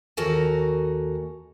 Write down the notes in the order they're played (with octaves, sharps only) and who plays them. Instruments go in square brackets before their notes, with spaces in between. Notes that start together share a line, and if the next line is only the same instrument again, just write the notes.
[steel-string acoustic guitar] D#2 F#4 A4 A#4 G#5